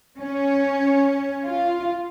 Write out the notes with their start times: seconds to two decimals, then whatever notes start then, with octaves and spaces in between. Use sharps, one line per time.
0.18 C#4
1.45 F4